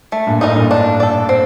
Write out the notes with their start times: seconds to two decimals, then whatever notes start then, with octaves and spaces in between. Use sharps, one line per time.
0.12 A3
0.27 G2 A#2
0.41 A2 D#4 A#4 D#5
0.56 G2 A#2
0.71 D4
1.00 A4 D5
1.29 C4